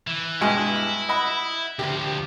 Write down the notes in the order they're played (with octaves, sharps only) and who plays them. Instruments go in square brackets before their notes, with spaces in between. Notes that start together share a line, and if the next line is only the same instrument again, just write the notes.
[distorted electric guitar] E3
[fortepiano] G2 B2 G#3 [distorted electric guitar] E4
[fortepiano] D#5 F#5 B5
[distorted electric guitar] D2 F3 [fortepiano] G4